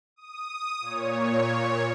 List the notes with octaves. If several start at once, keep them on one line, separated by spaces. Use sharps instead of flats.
D#6
A#2 C#5